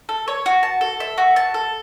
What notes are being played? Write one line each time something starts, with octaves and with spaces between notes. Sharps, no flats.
A4
C#5
F#4
A5
A4
E5
F#4
A5
A4